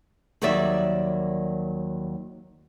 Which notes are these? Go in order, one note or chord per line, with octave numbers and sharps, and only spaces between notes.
D#2 D#3 F#3 G3 D5 E5